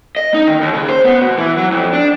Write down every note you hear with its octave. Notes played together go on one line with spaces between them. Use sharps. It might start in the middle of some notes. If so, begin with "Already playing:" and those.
D#5
D#4
D#3
D#2
C#3
C5
B3
B2
E3
F#3
F2
D4